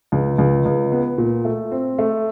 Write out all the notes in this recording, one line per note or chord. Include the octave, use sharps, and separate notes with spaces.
C#2
C#2
C#2
B3
A#2
A3
C4
A3